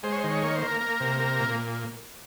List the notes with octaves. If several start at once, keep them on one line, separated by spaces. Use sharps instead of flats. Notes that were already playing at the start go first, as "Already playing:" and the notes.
G#3 C5
C#5
C5
D#3
C#5
A#3 C#5
C5
A#3
A#4
A#3
C3
A#3
A#2